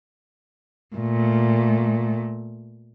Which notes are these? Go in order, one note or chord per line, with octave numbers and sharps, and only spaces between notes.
A#2 A3